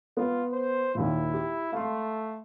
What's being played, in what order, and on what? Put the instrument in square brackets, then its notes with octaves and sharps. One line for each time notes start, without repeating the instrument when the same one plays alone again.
[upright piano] B3 [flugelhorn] F4
[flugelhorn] C5
[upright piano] D#2 A#2 [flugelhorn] E4
[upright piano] G4
[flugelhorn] A3 [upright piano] F5 C6